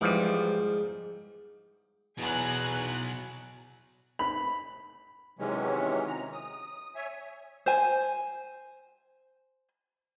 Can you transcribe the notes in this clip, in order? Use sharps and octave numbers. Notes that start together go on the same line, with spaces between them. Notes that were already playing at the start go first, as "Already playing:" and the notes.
G#2 E3 F3 G3
E2 B2 F#3 G#5 A#5 F#6
B5
C3 D#3 E3 F#3 G#3 C#4
A#5
D#6
C#5 E5 G#5
C5 G#5